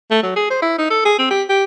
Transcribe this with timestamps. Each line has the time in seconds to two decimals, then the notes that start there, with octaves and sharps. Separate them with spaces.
0.11 A3
0.23 F#3
0.36 G#4
0.50 C5
0.62 E4
0.78 D#4
0.90 A4
1.05 G#4
1.19 C4
1.31 G4
1.50 G4